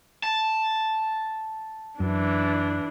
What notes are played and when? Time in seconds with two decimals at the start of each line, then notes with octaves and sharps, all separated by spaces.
0.23 A5
2.00 F#2 E3 D4